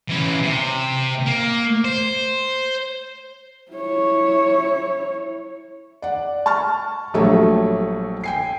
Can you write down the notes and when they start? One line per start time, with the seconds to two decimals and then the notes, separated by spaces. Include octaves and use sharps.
0.10 E3 C#4
0.43 C3
1.26 A#3
1.85 C5
3.71 E4 C#5
6.02 D5 F#5
6.46 A5 C#6 F6 A6
7.14 A#1 F#3 G3 A3 A4 C#5
8.24 G5 G#5 C7